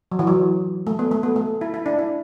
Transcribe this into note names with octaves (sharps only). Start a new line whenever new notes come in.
F#3
E3
F#3
A3
B3
A3
B3
A3
E4
E4
D4
E4